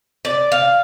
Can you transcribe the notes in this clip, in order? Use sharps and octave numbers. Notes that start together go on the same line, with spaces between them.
D5
F5